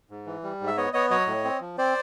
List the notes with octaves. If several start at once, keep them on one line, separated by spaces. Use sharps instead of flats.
G#2
E3
G3
G#2
E5
B3 C#5 D#5
B3 C#5 D#5
F#3 C#5 D#5
A2
C4
F3
C4 C5 D5